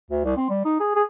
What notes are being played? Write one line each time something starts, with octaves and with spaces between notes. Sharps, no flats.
D2
C2
C4
G3
D#4
G#4
G#4